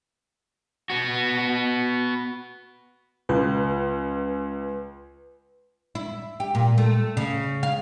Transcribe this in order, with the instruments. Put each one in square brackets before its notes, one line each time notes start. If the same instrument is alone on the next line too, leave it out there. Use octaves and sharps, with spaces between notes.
[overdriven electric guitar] B3 F#4
[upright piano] C#2 [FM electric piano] B4
[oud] E4
G4
A#2
A3
C#3
F5